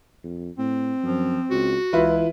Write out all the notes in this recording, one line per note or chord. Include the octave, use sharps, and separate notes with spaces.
F2
A2 C4
F#2 F3
C#2 F#4
C#2 E3 E4 F4 B4